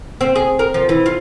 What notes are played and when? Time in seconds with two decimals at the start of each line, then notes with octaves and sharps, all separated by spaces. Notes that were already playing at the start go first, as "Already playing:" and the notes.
0.21 C4
0.36 G#4
0.59 A#4
0.74 F3
0.89 E3
1.06 F4